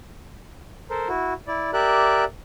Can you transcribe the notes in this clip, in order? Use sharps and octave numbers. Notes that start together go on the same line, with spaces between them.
A4 A#4 C5
E4 F#4
E4 D5
G4 A#4 D5 E5 F#6